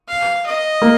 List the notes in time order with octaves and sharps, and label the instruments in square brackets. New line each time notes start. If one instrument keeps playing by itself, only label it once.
[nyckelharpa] F5
D#5
[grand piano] A#3